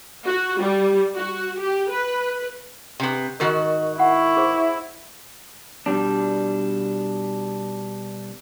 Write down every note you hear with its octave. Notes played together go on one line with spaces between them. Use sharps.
F#4
G3
F#4
G4
B4
C3 B3
G#2 D#3 F#4 A#4 D#5
E4 F#5 C#6
G#4 C5
B2 G3 D4